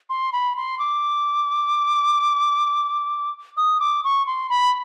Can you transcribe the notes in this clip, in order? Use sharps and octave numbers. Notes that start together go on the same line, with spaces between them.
C6
B5
C6
D6
D#6
D6
C#6
C6
B5